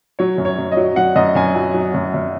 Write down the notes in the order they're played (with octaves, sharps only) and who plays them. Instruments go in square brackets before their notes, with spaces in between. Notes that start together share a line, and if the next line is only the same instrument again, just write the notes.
[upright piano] F#3 C#5
F#2
C#5
F#2
D#5
F#3
F#3 F#5
F#2 D#5
F#2 G#5
F#3 G#5
F#3
F#2
F#2